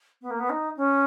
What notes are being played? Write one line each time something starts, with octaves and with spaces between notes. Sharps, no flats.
B3
A#3
B3
D#4
C#4